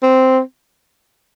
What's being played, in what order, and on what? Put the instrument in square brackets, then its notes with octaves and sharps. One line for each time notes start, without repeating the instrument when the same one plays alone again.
[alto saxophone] C4